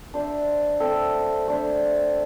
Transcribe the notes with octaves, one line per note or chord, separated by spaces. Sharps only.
D4 C5 E5
A3 C4 A4 E5
A3 D4 C5 E5